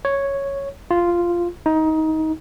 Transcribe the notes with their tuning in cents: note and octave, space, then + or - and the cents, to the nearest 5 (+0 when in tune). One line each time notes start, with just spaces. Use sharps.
C#5 +0
F4 -5
D#4 +20